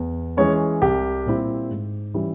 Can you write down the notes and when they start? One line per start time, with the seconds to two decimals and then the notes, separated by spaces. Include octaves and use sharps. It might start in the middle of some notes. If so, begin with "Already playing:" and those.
Already playing: E2
0.37 E3 G#3 C#4 C#5
0.82 C2 G4
1.26 A#2 G3 C4 E4
1.71 G#2
2.14 E3 G3 C#4 E4